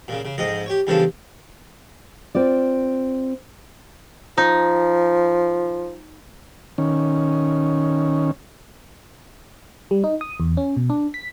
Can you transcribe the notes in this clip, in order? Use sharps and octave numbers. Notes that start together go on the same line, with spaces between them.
A#2 C#3
C#3
F2 G#2 D#5
G4 C#5
E2 G2 C#3 F3 A4
C4 F4 D5
F3 D#4
D#3 C#4
G3
D#4
D#6
E2
C#4
B2
D4
B6